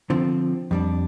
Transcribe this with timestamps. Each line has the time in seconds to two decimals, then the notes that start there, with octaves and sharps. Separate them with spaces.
0.10 D3 F3 C4
0.71 F2 G3 D4